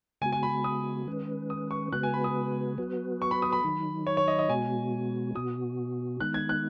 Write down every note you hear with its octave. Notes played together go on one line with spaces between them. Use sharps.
C#3 G#3 B3 F#4 G#5
G#5
B5
D#6
D#3 G#3 C#4 B4
D#6
C#6
C#3 G#3 B3 F#4 B4 F#6
G#5
B5
D#6
F#3 B3 F#4 B4
C#6
B5
D#6
B5
D#3 F#3 D#4
C#5
C#5
D#5
D#5
B2 G#3 B3 F#4 G#5
B2 B3 F#4 D#6
D#3 G#3 B3 D#4 F#6
G#6
F#6